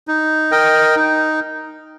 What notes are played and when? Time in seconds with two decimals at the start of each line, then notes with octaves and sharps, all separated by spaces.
0.08 D#4
0.51 A#4 D#5 G5
0.96 D#4